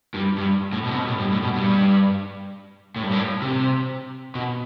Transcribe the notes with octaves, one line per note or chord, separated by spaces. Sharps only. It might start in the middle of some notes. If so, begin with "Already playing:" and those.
G2
G2
A2
B2
C3
B2
A2
G2
A2
B2
G2
A2
G2
A2
C3
B2